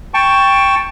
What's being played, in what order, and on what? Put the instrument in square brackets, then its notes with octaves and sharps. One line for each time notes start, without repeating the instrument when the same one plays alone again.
[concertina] G5 A5 C#6